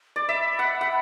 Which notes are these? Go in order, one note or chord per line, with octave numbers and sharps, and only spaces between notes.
D5
E5 B5
F#5
F#5